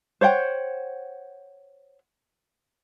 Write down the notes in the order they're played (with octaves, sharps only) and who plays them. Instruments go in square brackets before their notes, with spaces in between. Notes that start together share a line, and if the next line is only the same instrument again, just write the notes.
[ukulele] C5 C#5 F#5 G5